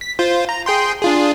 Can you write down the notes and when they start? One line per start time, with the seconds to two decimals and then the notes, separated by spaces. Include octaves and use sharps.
0.01 B6
0.19 F4 C5
0.49 A#5
0.66 G#4 G5 C6
1.02 D4 F4 G#4